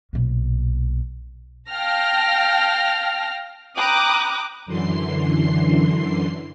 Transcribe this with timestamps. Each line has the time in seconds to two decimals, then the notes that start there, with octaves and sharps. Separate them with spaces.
0.13 B1 A#2
1.71 F5 G5 A5 F6 A#6
3.77 G5 A#5 B5 D6 D#6 F#6
4.66 F#2 D3 E3 C6 C7